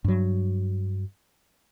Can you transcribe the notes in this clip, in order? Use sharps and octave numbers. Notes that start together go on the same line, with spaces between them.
G2 F#3